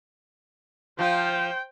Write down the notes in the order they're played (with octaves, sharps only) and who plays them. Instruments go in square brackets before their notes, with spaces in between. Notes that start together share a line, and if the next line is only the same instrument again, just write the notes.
[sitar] F3 F4 [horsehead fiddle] C5 [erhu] G5